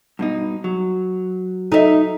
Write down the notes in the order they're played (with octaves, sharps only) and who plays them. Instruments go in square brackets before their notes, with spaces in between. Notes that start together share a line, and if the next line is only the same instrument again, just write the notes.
[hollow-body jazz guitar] G2 B2 D#4
F#3
[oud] D#4 E5 [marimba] A4 D#5